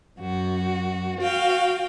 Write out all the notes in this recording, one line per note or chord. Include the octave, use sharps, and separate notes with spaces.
F#2 F#4
F#4 F5 G5